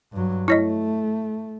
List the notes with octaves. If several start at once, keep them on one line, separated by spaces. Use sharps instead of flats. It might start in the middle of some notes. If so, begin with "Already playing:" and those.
G2 F#3
A3 E4 C#5 D#5